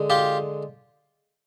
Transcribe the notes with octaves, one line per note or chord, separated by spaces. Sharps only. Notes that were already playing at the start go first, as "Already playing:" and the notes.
Already playing: D3 G#3
F4 G4